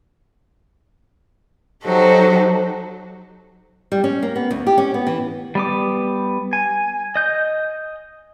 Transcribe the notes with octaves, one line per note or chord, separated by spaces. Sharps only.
F#3 D#4 F#4 G4 A4 C5
G3
C#4
A#3
B3
D2
G4
C#4
B3
E3
G3 B3 D6
G#5
D#5 G6